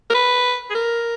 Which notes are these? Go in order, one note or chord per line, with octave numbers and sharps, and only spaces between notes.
A#4
B4
G#4
A#4